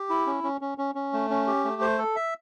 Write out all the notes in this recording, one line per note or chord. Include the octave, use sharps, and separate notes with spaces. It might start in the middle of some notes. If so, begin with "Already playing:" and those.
Already playing: G4
E4
C#4
C#4
C#4
C#4
C#4
A3
C#4
G4
A3
C5
A4
E5